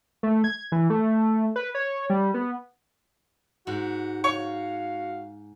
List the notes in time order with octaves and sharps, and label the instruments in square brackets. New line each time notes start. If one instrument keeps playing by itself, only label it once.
[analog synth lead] A3
G#6
E3
A3
B4
C#5
G3
B3
[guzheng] G#2 [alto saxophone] F#4
[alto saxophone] F#4 [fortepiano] C#5 [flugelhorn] F5